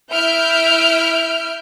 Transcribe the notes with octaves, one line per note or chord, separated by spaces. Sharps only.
E4 E5 F6 G6 D7